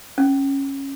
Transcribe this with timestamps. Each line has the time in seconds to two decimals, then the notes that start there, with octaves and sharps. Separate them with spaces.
0.18 C#4